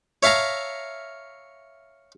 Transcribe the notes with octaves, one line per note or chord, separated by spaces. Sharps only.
C#5 E5 F5 A5 A#5